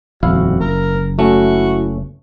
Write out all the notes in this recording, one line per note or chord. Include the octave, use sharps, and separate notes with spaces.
D#1 F2 E4 F#4 F5
F#1 A#4
A3 C#4 E4 F#4